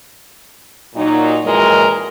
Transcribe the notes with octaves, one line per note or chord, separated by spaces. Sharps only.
A#2 F#3 D#4
F2 A#2 E3 F#3 G#3 A#4